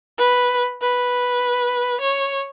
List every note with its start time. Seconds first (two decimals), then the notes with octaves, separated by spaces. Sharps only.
0.18 B4
0.81 B4
2.01 C#5